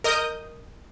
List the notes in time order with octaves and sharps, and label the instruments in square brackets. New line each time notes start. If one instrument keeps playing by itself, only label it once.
[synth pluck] A#4 D#5 D#6 G6